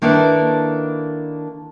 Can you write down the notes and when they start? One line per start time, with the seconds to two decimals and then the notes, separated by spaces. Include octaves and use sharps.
0.02 D#3 A#3 D4 E4 A4 B4